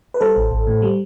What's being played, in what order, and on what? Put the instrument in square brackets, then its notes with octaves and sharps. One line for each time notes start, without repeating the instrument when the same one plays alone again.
[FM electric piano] B4
G3 A4 C5
A1
A1
A2
G3